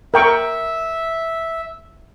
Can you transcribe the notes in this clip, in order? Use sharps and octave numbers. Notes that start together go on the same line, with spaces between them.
A#4 E5 G5 C#6